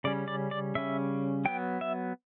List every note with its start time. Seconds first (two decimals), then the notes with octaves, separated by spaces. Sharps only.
0.04 C#3 G3 C#4 D5
0.28 D5
0.51 D5
0.75 C#3 G3 C#4 E5
1.45 F#3 B3 G5
1.81 E5